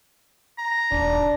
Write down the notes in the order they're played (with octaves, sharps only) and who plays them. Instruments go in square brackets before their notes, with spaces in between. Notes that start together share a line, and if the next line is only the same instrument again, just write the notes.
[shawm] A#5
[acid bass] D#1 [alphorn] D4